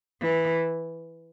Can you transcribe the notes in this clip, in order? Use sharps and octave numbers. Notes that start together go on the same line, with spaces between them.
E3